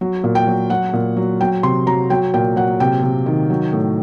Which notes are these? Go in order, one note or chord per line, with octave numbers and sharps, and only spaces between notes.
F#3
A#2
G5
F#3
F#3 F#5
A#2
F#3
F#3 G5
C3 C6
F#3 A#5
F#3 G5
A#2 G5
F#3 F#5
C3 G5
C3
D#3
F#3
A2